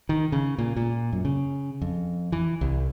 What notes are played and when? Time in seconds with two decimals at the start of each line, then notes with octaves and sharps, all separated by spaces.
0.09 D#3
0.32 C#3
0.58 A#2
0.77 A#2
1.12 F#2
1.25 C#3
1.82 F2
2.32 E3
2.61 C2